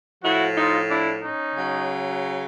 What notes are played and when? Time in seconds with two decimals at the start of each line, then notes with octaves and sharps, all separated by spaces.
0.24 A2 F3 E4 F#4
0.56 D#4 F4
0.89 D4 E4
1.22 C#4 D#4
1.55 C#3 F#3